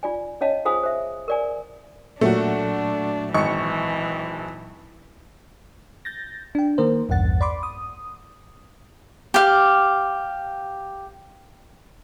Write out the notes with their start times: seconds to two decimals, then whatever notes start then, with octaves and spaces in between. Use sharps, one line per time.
0.03 F4 D5 G#5
0.41 C#4 C#5 D#5 F5 A5
0.65 F4 G#4 C5 F5 G#5 D#6
0.83 C5 E5
1.28 A#4 D5 G#5
2.21 A#2 F#3 A3 D4 F#4
3.34 G#1 E3 C#6 C#7
6.05 G6 A6 A#6
6.55 D4 G5
6.78 D#3 A#3 A#4 C5
7.09 A#1 E2 G2 F#5 A6
7.41 D5 B5 C6 D6
7.63 D#6
9.34 G4 F5